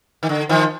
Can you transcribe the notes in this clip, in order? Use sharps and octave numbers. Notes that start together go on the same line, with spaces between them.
D#3
D3
D#3 F3